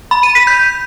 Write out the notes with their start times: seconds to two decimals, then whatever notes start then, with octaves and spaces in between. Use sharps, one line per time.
0.11 B5
0.23 D#7
0.35 B6
0.47 G6